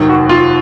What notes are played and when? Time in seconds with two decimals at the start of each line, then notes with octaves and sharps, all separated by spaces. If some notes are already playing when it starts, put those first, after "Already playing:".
Already playing: F1 D#2 D#3 F#3
0.09 F#4
0.29 F4